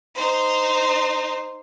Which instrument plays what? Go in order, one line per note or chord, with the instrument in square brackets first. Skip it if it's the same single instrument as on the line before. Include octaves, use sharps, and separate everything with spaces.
[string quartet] D#4 C5